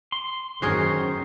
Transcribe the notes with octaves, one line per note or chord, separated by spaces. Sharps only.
C6
F#2 D#3 C#4 F#4 G#4 A#4 C5